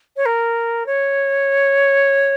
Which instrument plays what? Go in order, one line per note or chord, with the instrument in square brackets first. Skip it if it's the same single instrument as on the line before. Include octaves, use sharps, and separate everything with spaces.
[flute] C#5
A#4
C#5